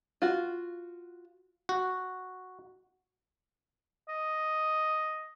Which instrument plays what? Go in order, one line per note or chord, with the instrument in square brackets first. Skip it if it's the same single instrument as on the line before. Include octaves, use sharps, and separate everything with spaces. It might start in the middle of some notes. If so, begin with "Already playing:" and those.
[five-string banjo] F4 F#4
[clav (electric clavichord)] F#4
[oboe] D#5